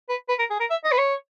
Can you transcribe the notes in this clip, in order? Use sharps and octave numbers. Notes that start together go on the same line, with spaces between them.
B4
B4
A#4
G#4
A#4
E5
D#5
B4
C#5